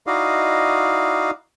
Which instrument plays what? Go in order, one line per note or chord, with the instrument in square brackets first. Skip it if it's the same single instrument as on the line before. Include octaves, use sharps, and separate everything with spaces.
[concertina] D#4 E4 F#4 D5 D#5 F5